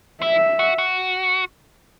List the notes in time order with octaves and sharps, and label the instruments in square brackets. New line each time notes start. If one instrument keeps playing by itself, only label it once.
[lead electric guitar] E4 [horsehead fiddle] E5
[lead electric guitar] F#4
F#4